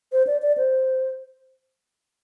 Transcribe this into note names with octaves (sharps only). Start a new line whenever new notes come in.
C5
D5
D5
C5